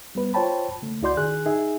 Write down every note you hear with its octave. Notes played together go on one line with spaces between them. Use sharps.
G3 B3 B4
F4 C5 C#5 G5 A5 B5
C#3 A3
C#2 E4 F#4 D5 C6 G6
D#3 G#4 F#6
D#4 G#4 E5